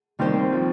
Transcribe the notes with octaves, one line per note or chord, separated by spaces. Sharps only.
D#2 D#3 G3 C4 G4 C5
F3